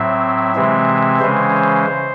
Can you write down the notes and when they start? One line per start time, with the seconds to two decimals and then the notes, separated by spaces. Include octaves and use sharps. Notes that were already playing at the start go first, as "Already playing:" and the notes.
Already playing: A2 F#3 C4 E5
0.55 C3 E3 G#3 C4
1.20 C#3 E3 G#3 C#4 C5